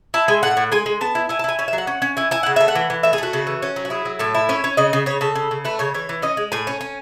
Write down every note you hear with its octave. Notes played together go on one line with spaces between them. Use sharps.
E4 A5
G#3 G#5
A2 F#5
A2
G#3 G#5
G#3
B3 A5
E4
E4 G#5
A5
E4 G#5
C#4 G#5
E5
F#3
F#5
C#4
C#4
E4 G#5
E4 G#5
C#3 F#5
A3 E5
F#5
E3
E3
A3 E5
G#4
A3 F#4
C#3
E3
C#4
F#3
F#4
E4 G#4
F#3
A2 A4
E4
C#4 C#5
C#4
C#3 D#5
C#3
C#3 C#5
C#3 A4
C#3
C#3
A3 B4
C#3 C#5
E3 C#5
E3
C#4 D#5
G#3
A2 G#5
C#4
C#4